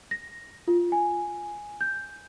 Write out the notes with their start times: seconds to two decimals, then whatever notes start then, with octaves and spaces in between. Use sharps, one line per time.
0.11 A#6
0.68 F4
0.92 G#5
1.81 G6